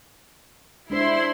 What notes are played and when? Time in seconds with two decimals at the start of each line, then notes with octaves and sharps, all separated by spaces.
0.90 G#3 D4 E4 C5 C6